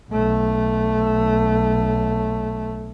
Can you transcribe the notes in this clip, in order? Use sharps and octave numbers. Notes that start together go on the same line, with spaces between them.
B1 A3